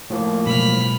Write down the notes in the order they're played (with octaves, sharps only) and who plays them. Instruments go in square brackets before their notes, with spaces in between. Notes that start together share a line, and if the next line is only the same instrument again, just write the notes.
[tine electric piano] A2 F3 A#3
[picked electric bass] B2 F#3 G#3 [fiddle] B5 F6